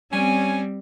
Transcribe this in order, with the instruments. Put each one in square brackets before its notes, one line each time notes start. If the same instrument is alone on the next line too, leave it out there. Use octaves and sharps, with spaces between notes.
[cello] G3 C4 [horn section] C#4 G#5